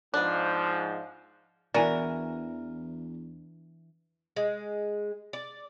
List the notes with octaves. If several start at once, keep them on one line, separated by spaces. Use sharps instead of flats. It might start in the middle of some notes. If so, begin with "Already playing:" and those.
G#2 F3 B3 D4
E2 E3 D4 F#4 A#4 D5 G#5
G#3
D5